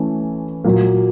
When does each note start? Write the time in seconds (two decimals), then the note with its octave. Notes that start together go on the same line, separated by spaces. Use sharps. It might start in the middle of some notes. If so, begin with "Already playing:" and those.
Already playing: E3 A3 C#4
0.64 A#2 F#3 A#3